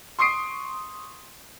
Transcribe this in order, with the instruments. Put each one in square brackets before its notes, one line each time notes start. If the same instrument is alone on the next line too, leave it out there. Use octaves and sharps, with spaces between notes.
[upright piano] C6 C#6 D#6 C7 D7